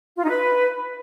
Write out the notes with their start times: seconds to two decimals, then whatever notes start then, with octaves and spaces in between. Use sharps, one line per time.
0.17 F4
0.24 D#4
0.30 B4